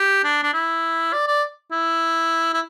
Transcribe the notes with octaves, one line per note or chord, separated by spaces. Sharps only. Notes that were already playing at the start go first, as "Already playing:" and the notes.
Already playing: G4
D4
D4
E4
D5
D5
E4
E4